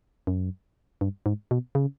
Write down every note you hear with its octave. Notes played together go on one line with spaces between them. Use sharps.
F#2
G2
G#2
B2
C#3